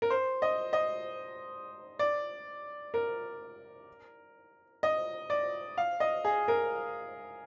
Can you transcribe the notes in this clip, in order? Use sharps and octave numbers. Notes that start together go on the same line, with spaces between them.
A#4
C5
D#5
D#5
D5
A#4
D#5
D5
F5
D#5
G#4
A#4